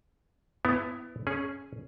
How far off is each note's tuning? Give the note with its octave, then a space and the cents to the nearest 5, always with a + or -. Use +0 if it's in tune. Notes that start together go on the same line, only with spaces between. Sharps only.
B3 +25 E4 +5
C#4 +0 G#4 +0